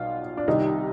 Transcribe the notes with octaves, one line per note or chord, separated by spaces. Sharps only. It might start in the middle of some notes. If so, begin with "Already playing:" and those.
Already playing: B1 B2 G3 F4
D4
C2 C3 D#3 G3 D#4